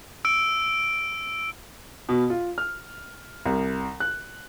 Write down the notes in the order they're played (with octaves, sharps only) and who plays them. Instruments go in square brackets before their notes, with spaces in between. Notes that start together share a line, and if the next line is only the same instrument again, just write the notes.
[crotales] E6 D7
[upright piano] B2
F4
F6
C2
F#6